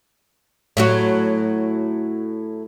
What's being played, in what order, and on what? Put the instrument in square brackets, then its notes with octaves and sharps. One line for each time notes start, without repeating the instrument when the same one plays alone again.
[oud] A2 F#3 F#4